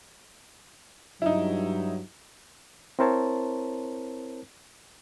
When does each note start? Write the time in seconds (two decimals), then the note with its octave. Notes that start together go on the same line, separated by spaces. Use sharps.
1.22 G2 F#3 D#4 E4
2.99 C4 E4 A#4 C5 C#5 A5